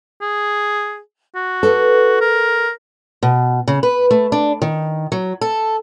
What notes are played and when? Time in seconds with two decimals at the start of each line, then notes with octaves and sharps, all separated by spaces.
0.22 G#4
1.35 F#4
1.63 A4 B4
2.21 A#4
3.23 B2
3.68 C#3
3.83 B4
4.11 A3
4.32 D4
4.62 D#3
5.12 F#3
5.41 A4